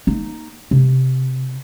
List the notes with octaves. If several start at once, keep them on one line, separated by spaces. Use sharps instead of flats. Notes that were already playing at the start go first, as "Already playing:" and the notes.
A#3 D#4
C3